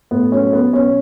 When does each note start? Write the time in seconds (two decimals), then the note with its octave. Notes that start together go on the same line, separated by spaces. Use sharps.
0.11 A2 B3
0.32 F#3 C#4
0.53 F#3 B3
0.73 B2 C#4